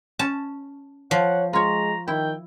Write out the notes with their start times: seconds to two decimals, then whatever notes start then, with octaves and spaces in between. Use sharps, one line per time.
0.19 C#4 A5
1.11 F3 C#5 F#5
1.53 G#3 F4 C#5 A#5
2.08 D#3 E4 G5